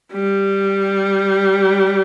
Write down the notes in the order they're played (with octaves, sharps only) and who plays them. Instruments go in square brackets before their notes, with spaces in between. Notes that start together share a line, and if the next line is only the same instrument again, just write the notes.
[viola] G3